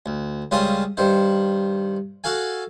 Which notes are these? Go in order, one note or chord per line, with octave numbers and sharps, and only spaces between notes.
D2
C#2 C#3 G3 F4 C5 D#6
G2 D#3 C5
F#4 A4 F5 G#5